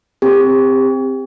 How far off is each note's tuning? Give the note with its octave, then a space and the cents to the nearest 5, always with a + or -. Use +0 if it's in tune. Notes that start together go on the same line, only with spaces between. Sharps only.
C4 +0 G4 +30